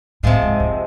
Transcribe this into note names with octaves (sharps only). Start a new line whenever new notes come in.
A2 C3 F3 G#3
G#2
F2